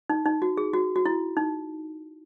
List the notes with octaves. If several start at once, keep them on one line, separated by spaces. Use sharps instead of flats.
D#4
D#4
F#4
G#4
F#4
F#4
E4
D#4